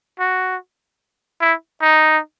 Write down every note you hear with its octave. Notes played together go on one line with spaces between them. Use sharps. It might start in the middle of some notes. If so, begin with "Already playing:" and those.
F#4
E4
D#4